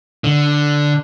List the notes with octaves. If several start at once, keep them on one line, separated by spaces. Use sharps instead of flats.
D3